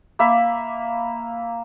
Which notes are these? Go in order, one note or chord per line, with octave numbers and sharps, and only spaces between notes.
A#3 E5 B5